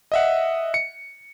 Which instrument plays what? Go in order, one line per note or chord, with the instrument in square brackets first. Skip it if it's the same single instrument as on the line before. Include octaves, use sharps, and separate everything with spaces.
[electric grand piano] D#5 E5 F#5
C#7